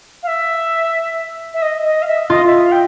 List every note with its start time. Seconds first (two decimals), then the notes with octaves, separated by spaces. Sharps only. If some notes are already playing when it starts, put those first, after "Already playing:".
0.23 F5
0.27 E5
1.54 E5
1.62 D#5
1.84 D#5
2.02 F5
2.07 E5
2.29 F4 D#5
2.46 E5
2.63 F5
2.72 G5